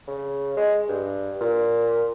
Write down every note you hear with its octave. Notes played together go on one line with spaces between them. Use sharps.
C#3
G#3
G2
A#2